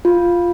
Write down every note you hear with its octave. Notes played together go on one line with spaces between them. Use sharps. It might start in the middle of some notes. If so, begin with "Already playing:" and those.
F4